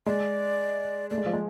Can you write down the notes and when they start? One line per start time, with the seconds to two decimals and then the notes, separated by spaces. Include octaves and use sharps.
0.06 G#3 D5
1.10 A3 D5
1.18 G#3
1.26 F3
1.33 G#3